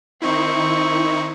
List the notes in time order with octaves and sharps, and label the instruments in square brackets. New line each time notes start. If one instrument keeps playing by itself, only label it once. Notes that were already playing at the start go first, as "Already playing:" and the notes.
[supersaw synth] D#3 D#4 E4 [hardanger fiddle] C4 C#6